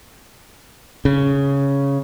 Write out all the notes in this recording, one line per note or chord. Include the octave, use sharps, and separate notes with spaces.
C#3